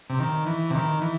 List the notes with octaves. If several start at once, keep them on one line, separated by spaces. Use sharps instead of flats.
C3
D#3
E3
C3
D#3
E3